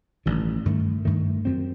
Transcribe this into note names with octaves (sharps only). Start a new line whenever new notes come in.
A1 G2 D#3
G2 D#3 A3
G2 D#3 A3
F#2 F#3 C4